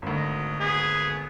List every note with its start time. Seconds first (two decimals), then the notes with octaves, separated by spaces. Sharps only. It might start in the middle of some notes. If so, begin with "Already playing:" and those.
0.02 G#1 D2
0.16 D#5
0.60 B3 G#4